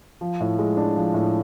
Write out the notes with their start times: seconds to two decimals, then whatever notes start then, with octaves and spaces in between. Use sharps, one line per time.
0.21 F3
0.40 A2
0.59 G#3
0.77 D4
0.96 F3
1.14 A2